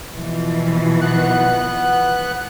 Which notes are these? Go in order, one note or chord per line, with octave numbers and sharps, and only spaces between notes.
B2 E3 F3
B3 F#6